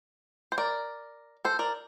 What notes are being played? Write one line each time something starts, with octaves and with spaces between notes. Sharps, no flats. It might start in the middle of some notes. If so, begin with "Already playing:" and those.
C5
A#4 D5
A4 C5
A#4 D5